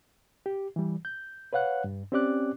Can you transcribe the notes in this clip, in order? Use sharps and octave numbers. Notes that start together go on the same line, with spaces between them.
G4
E3 G3
G6
B4 C#5 F5 F#5 F#6
G2
C4 C#4 G4 D5 D6 F#6